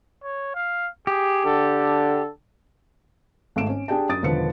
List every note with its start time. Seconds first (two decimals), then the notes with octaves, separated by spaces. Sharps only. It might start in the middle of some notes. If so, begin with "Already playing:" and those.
0.23 C#5
0.55 F5
1.07 G4 G#4
1.45 D3 A4
3.56 G#1 G#2 A3 C4 D7 E7
3.70 C#4
3.88 D4 G4 G#4 D5 G5 A5
4.09 F#2 D#6 A6 D7
4.22 E1 D3 D#3 F3 B4 C#7